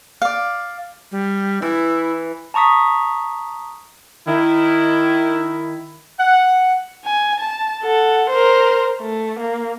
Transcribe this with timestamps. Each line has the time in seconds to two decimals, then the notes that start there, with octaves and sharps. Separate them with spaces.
0.22 D5 F5
1.12 G3
1.62 E3 E4
2.54 A5 A#5 C#6 D#6 B6
4.28 D#3 E4
6.19 F#5
7.05 G#5
7.40 A5
7.83 A4 F#5
8.29 A#4 C5
9.01 A3
9.39 A#3